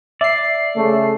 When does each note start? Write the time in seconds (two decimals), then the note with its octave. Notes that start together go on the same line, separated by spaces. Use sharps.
0.21 D5 E5 C7
0.76 C#3 A3